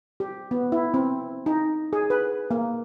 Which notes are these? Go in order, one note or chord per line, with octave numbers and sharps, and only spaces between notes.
G4
B3
E4
C4
D#4
G#4
B4
A#3